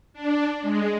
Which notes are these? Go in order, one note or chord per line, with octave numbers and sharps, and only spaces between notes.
D4
G#3